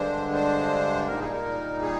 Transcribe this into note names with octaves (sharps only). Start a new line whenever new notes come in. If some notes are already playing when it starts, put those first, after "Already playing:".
Already playing: G2 D3 G#3 D4 C5
C5
A#2 G3 A#3 D#4 A#4
G#4
A#4
G#4